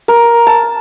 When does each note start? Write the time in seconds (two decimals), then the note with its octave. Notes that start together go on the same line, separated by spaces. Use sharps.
0.08 A#4
0.47 A5